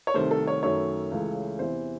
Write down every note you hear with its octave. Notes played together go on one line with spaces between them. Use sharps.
C#5
C2 C3 D#3 A3 C5
A4
C#5
F#2 D#3 A3 C#5
C#2 C#3 E3 A3
E2 C3 E3 C5